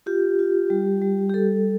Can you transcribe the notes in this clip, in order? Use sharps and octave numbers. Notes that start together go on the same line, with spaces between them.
F4 G4
F4
G3
G3
G4
G3 A4